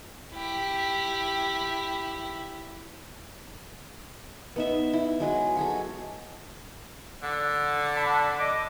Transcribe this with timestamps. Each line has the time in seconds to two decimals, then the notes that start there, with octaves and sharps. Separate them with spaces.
0.33 E4 G4
4.56 B3 D#4 E5
4.93 E4
5.20 F#3 G#3 B4
5.57 F#4 G#4 A4
7.23 D3
7.96 A5 B5
8.39 D5 D#5 D6